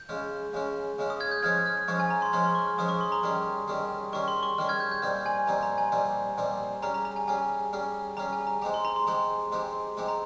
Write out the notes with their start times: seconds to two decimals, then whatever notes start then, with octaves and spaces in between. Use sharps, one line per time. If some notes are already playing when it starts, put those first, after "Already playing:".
Already playing: G6
0.09 C#3 G#3 C#4
0.53 C#3 G#3 C#4
0.98 C#3 G#3 C#4
1.10 D#6
1.20 F6 G#6
1.31 G6
1.43 F3 G#3 C#4 G#4 F6 G#6
1.66 F6
1.88 F3 G#3 C#4 G#4 C#6
2.00 G#5
2.10 A#5
2.22 C6
2.33 F3 G#3 C#4 G#4 C6
2.44 C6
2.55 C#6
2.67 F6
2.78 F3 G#3 C#4 G#4 D#6
2.89 C#6
3.01 C6
3.12 A#5
3.23 D#3 G3 C#4 G#4
3.68 D#3 G3 C#4 G#4
4.13 D#3 G3 C#4 G#4 C#6
4.28 C6
4.43 C#6
4.58 D#3 G3 C#4 G#4 F6
4.69 F6 G#6
4.80 G6
4.91 G6
5.02 A#2 G3 C4 D#4 F6
5.26 G#5
5.47 A#2 G3 C4 D#4 A#5
5.63 A#5
5.78 G#5
5.92 A#2 G3 C4 D#4
6.38 A#2 G3 C4 D#4
6.82 G3 C#4 G#4 A#5
6.94 A#5
7.05 A#5
7.16 G#5
7.27 G3 C#4 G#4 G#5
7.73 G3 C#4 G#4
8.17 G3 C#4 G#4 A#5
8.33 G#5
8.47 A#5
8.62 G#3 C4 D#4 G4 A#5
8.74 C6
8.85 A#5
8.96 C6
9.07 G#3 C4 D#4 G4
9.52 G#3 C4 D#4 G4
9.97 G#3 C4 D#4 G4
10.08 A#5